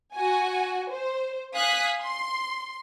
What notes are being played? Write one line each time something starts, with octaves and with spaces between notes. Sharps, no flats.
F#4 G#5
C5
F5 G#5 D#6 F#6 G#6 B6
C6